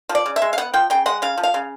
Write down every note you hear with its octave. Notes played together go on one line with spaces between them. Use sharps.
F3
D5
C#3
E5
G#3
F5
B3 F#5
F3 G5
C#3 G5
G#3 F#5
C#3 F5
F3
F5
C#3